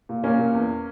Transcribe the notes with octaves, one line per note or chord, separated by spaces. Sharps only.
A#2
A#2 A#3 C#4
A#2
E2